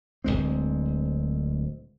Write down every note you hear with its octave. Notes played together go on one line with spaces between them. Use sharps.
D1 G#1 G#3 C4